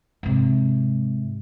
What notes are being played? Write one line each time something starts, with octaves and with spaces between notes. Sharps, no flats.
G#2 C3